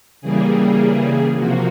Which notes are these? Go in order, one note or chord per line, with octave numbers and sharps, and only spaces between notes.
C#3 E3 G3 A#3 G#4
C3 F3 A#3 F#4